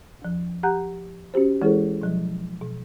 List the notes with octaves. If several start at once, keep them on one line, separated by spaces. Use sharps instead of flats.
E2 F3
G4 F#5 A#5 F#6 G6
C#4 F#4 G4 C5
E3 G#3 E4 G#4 A4 C5
B2 F3 F#3
B2